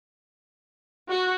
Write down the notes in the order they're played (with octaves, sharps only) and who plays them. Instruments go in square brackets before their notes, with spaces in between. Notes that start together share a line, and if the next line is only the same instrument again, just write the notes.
[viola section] F#4